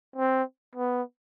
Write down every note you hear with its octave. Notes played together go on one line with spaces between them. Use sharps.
C4
B3